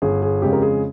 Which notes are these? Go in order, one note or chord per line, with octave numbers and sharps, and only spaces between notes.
G1 G#4
G#4
F2 C#3 G#3 G4
A#4
G#4